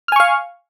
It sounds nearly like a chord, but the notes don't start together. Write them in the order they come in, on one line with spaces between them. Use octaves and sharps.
F6 G#5 C#6 F5